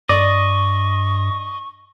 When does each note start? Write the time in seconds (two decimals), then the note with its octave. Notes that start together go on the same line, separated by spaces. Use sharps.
0.09 G2 D5 D#5 C#6